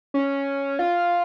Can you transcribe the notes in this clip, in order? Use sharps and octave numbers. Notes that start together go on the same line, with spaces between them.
C#4
F4